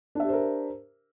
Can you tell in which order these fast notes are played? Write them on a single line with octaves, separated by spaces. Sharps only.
D4 E5 G4 C5 A#4